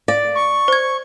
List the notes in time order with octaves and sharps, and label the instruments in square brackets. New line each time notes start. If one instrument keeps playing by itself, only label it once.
[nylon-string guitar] D5 [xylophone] F5
[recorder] C#6
[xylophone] C5 G#6